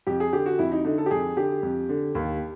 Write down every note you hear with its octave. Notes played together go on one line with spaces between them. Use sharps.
F2 G4
G#4
D3 G4
F#4
F2 E4
D#4
D3 D#4
A4
G4
F2 G#4
D3 G4
F2
D3
D#2